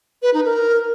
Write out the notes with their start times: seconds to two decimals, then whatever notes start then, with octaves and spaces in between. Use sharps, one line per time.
0.22 B4
0.34 D#4
0.45 A#4